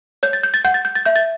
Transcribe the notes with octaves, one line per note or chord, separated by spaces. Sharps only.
C#5 G6
A6
G6
A6
F#5 G6
A6
G6
A6
E5 G6
A6